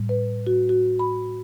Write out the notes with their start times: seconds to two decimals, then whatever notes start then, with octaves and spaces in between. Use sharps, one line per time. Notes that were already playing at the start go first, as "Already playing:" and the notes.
Already playing: A2 G3
0.09 B4
0.47 F#4
0.69 F#4
0.99 B5